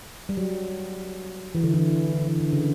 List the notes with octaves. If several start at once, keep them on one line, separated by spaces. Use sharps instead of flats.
G3
F#3
E3
D3
E3
D3
E3
D3
C#3